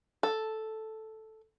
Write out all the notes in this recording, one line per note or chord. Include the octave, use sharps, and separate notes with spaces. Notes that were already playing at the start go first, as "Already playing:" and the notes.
A4